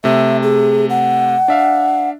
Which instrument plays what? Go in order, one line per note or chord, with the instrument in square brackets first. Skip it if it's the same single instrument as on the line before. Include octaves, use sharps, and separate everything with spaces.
[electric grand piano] C3 A3 [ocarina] E5
[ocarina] G#4
F#5
[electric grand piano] D4 E5 F5